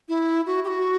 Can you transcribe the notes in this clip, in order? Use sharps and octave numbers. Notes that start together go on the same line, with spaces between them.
E4
F#4
G4
F#4